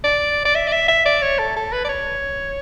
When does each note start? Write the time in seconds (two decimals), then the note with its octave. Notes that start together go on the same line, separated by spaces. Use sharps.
0.04 D5
0.45 D5
0.55 E5
0.68 D5
0.72 E5
0.89 E5
1.06 D5
1.22 C#5
1.39 A4
1.56 A4
1.73 B4
1.85 D5
1.89 C#5